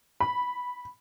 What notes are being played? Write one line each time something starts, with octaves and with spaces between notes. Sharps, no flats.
B5